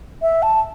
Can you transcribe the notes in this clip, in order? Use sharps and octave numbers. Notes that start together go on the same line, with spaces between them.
E5
A5